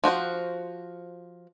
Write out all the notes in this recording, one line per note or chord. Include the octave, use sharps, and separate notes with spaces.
F3 F#4 C5 F#5